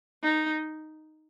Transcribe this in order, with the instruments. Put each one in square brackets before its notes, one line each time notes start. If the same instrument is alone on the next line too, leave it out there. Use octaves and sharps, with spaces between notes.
[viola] D#4